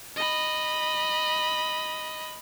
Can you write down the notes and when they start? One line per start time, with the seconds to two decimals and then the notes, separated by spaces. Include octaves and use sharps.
0.16 D#5 B5